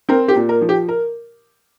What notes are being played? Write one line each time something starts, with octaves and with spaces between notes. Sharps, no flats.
C4 A#4
G4
A#2
A#4
F3
G4
A#4